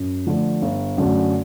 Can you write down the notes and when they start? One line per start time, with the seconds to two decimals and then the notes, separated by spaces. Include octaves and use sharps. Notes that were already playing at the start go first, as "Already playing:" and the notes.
Already playing: F#2
0.27 D3 F3 A3
0.62 G1
0.98 F#2 D3 F#3 A3